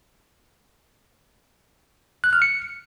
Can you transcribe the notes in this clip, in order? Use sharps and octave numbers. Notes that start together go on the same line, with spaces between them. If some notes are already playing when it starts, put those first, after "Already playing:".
F#6
F6
C#7